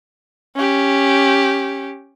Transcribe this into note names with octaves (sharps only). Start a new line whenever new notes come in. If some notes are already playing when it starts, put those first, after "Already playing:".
C#4 G4